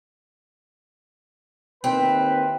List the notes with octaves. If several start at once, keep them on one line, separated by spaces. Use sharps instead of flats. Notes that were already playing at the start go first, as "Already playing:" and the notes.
D#2 C4 E4 B4